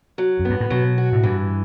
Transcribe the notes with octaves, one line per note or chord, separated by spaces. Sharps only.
F#3
F#2
G2 B3
A2
B2 F#3
F#4
A2
G2 E3